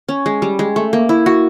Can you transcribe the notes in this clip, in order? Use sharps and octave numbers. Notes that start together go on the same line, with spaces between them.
C#4
G#3
G3
G#3
A3
A#3
E4
F#4